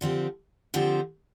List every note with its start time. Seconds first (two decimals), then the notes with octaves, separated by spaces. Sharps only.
0.01 D3 F3 C4 G4
0.74 D3 F3 C4 G4